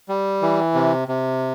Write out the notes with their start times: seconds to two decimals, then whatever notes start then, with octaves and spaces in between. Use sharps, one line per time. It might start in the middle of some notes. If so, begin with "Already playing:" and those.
0.09 G3
0.42 E3
0.74 C3
1.08 C3